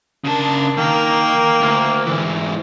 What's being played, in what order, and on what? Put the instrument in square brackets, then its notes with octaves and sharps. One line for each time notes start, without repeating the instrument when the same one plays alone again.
[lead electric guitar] C#3 A5 [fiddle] D4 A#4
[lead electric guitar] D#3 [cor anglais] A#3 [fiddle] A#4 G5
[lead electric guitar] D2
G#2 E3